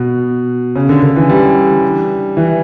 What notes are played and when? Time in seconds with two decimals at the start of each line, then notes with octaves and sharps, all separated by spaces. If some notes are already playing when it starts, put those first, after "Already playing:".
Already playing: B2
0.76 C#3
0.89 D3
1.02 D3
1.16 E3
1.29 G3
2.37 E3